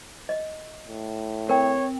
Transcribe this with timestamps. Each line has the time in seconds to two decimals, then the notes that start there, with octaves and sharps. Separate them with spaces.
0.29 D#5
0.88 A2
1.49 C4 A#4 C#5 G5